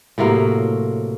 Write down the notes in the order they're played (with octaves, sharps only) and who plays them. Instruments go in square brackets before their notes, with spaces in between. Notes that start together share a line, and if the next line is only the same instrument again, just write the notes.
[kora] A2 C3 F#3 A#3